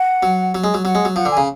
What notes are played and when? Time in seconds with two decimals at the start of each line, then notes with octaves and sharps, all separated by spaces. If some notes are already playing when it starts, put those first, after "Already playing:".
Already playing: F#5
0.23 F#3
0.55 F#3
0.64 G#3
0.74 F#3
0.85 F#3 F#5
0.95 G#3
1.05 F#3
1.16 F3 F#5
1.25 D3
1.31 G#5
1.37 C#3